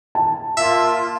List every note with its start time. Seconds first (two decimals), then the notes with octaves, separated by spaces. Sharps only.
0.15 A5
0.57 A#3 F4 E5